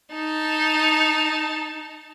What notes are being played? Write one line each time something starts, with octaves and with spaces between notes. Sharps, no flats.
D#4 A5